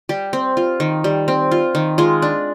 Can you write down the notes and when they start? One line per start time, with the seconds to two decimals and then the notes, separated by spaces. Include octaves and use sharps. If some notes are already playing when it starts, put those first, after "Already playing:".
0.09 G3 G4
0.33 C4
0.57 F4
0.80 D#3
1.04 G3
1.28 C4
1.51 F4
1.75 D#3
1.98 G#3 F4
2.22 D4